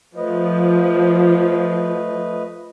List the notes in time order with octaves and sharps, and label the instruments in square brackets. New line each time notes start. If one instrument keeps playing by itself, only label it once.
[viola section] F3 [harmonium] A3 B4 D#5